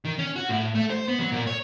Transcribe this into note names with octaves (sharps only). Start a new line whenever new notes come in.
D#3
C#4
F#4
A2
A3
C5
B3
F#3
A#2
C#5